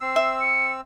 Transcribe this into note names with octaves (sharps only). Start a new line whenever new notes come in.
C4 E6 C7
E5
C#7